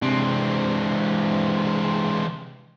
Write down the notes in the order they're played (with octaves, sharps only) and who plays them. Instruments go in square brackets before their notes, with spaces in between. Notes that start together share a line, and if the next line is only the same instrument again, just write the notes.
[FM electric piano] C3 [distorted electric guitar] E3 C4 [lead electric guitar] G#3 D4